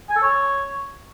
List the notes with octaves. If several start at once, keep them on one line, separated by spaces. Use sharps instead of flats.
G#5
A4
C#5